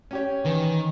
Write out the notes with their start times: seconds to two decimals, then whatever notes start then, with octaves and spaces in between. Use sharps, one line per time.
0.11 C#4 G4 C#5
0.45 D#3 E3